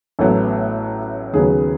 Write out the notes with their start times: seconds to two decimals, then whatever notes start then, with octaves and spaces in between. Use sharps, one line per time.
0.19 A1 A2 F#3 B3 A4
1.34 D#2 C#3 F#3 B3 G#4